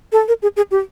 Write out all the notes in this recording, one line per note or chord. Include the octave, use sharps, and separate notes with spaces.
A4
A#4
G#4
G#4
G4